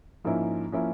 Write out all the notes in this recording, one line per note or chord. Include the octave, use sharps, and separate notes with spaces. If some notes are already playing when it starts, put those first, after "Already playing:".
G#2 F3 A#3 C#4 E4
F3 A#3 C#4 E4